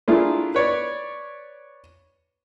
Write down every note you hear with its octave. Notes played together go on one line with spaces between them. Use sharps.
A3 A#3 D4 E4 F4 G#4
B4 C#5 D5